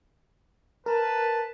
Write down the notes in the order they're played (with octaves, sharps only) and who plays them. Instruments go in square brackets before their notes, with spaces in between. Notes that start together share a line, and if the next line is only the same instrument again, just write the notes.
[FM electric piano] A#4 [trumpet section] B4 A5